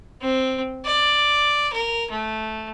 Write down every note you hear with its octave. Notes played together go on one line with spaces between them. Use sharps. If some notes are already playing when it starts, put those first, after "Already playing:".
C4
D5
A#4
A3